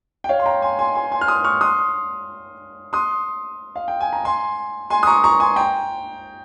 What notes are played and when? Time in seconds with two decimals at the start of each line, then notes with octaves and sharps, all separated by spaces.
0.24 G5
0.29 C#5 F5
0.40 C6
0.46 G5 A#5
0.62 G#5 C6
0.79 G#5 C6
0.95 G#5 C6
1.12 G#5 C6
1.21 F6
1.28 C6 D#6
1.44 C#6 F6
1.61 C6 D#6
2.93 C6 D#6
3.76 F5
3.88 G5
4.00 G#5
4.13 A#5
4.25 G#5 C6
4.90 G#5 C6
5.03 D#6
5.07 A#5 C#6
5.24 A#5 C#6
5.40 G#5 C6
5.56 G5 A#5